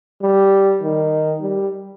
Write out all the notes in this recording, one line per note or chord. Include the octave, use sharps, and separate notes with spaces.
G3
D#3
G3